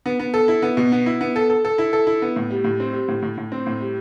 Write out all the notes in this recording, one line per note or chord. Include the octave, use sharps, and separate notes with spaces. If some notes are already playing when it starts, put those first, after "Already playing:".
B3
B3
A4
E4
B3
B2
B3
E4
B3
A4
A4
A4
E4
A4
E4
B3
A2
G3
A2
C4
G3
A2
A2
A2
C4
A2
G3